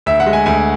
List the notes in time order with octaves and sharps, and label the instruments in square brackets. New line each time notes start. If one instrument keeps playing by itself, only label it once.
[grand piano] D2 E5
F#5
G#3
G#5
D2 G#5